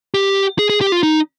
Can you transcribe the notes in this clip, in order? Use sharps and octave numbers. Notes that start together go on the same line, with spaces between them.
G4
G#4
G#4
G4
F4
D#4